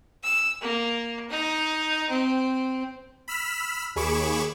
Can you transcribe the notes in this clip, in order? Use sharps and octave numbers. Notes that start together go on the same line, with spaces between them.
E6
A#3
D#4
C4
B5 E6 F6 B6
D#2 G#4 B5 C#6 D6 E7